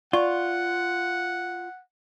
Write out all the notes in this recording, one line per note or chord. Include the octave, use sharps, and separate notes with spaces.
F4 D5 F#5 C#6